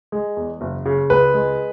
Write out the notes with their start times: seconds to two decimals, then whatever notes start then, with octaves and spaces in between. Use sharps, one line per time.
0.12 G#3
0.37 E2
0.61 F#1
0.86 C#3
1.10 C#2 B4
1.34 G#3